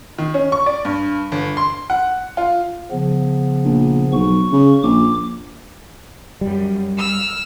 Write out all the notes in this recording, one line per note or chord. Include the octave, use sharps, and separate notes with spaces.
D#3
C#4
C#6
D5
G2
G1
C6
F#5
F4
C#3 F3 B3
A#1
B1 C#6
C#3
A#1 D6
F#2 G3
E6 F6